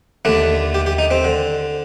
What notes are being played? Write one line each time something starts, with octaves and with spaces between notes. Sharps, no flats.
D#2 D3 A3 D4
G4
G4
D#4
C4
D3